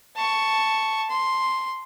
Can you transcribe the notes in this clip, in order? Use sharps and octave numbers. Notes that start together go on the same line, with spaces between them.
A5 C#6
C6